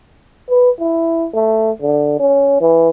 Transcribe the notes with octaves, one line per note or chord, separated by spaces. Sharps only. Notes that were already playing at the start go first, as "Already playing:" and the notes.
B4
E4
A3
D3
C#4
E3